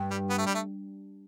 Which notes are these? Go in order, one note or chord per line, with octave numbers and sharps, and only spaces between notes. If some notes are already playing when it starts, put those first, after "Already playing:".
Already playing: G2
G3
B3
A3
G3
A3